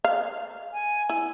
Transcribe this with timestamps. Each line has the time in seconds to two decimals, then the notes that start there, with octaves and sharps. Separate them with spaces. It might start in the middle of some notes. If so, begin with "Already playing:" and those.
0.04 F5
0.73 G#5
1.09 E4